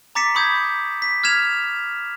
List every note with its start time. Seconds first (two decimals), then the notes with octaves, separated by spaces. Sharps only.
0.15 A#5 D6 A6 B6 C#7 E7
0.35 B5 C#6 D#6 G6 G#6
1.02 B6
1.24 F6 G#6 B6 E7 F7